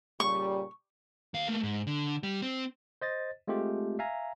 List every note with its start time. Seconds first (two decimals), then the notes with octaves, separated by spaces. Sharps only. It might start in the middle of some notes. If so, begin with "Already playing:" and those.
0.20 A#2 C#3 G3 C#6
1.34 D#2 F5
1.47 A3 A#3
1.63 G#2
1.87 D3
2.23 G3
2.42 C4
3.01 C5 D#5 A6
3.48 G#3 A3 C4 F4 G4
3.99 E5 F5 G#5 A#5